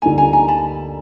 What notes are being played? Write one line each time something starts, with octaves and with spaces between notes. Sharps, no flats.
D2 D3 G3 A#3 D#4 G#5 A#5
G#5 A#5
G#5 A#5
A5 B5